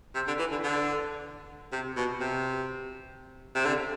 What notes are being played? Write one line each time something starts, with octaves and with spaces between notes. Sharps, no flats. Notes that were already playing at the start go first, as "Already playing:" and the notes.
C3
D3
E3
D3
D3
C3
B2
C3
C3
D3